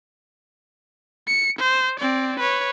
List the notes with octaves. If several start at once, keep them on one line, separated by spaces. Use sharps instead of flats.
C#7
C5
C4 D5
B4 C#5